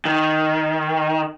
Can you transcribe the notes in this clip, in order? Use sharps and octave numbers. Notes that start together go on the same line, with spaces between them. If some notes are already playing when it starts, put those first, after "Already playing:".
D#3